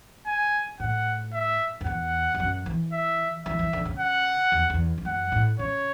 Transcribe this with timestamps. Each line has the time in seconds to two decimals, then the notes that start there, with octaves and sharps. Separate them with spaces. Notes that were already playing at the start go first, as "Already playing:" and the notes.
0.26 G#5
0.80 A2 F#5
1.33 E5
1.81 F#2
1.86 E2 F#5
2.35 E2
2.40 F#2
2.66 E3
2.93 E5
3.45 E3 E5
3.59 E3
3.73 D3
3.85 C#3
3.99 F#5
4.52 E2
4.70 E2
4.98 E2
5.05 F#2 F#5
5.32 A2
5.59 C#3 C#5